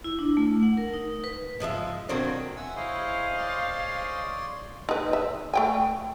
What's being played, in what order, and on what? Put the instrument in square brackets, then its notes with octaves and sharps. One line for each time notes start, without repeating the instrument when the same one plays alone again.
[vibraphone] E4
D4
A3
F#5
A#4
D#4
B4
[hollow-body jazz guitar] G#2 F3 G#3 E5
B2 D#3 F#3 A#3 C4 D4
[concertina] E5 G#5 E6 [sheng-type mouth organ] F#5
[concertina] E4 C#5 [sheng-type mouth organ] G#4 C5 D#5 [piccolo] F5
[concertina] C#5 D5 C6
[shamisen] D#4 B4
E5
A3 G5 G#5